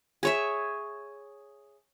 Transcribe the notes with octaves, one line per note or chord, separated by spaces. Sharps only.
G#4 C#5 E5